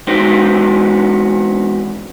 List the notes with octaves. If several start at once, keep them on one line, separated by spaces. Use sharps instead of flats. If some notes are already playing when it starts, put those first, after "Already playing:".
E3 G#3 B3 C4 D#4 F#4